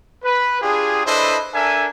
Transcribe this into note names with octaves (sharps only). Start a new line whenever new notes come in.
B4
D4 F4 G4 G#4
D4 E4 A4 B4 C5 D#5
D4 A4 A#4 E5 G#5